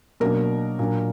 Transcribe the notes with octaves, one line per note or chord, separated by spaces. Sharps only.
B2 F#3 A#3 D4 A#4
A#2 F#3 D4